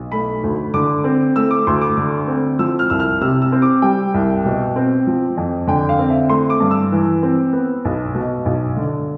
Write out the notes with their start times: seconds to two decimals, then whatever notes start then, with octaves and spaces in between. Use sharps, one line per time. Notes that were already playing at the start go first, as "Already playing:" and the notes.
Already playing: B1
0.12 A3 B5
0.43 D2
0.74 D3 D6
1.04 C4
1.36 A3 E6
1.51 D6
1.67 D2 C6
1.81 D6
1.97 D3
2.28 C4
2.59 F3 E6
2.79 F6
2.90 C2 E6
3.00 F6
3.21 C3 E6
3.42 E6
3.52 C4
3.62 D6
3.82 G3 G5
4.14 C2
4.45 B2
4.76 C4
5.07 F3
5.37 F2
5.67 D3 G5
5.89 F5
5.99 C4
6.10 E5
6.29 A3 C6
6.50 D6
6.60 G2
6.71 E6
6.92 E3
7.23 C4
7.53 B3
7.85 B1
8.15 B2
8.45 B1
8.76 D3